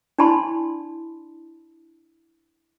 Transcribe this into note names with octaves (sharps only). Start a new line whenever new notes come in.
D4 E4 D5 A5 B5 C6